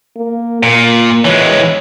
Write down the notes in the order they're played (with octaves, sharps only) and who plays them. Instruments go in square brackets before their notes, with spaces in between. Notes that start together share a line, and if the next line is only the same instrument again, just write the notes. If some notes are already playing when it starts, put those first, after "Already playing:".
[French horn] A#3
[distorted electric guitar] A#2 [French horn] A#3
[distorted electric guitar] E3 G#3 [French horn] C#5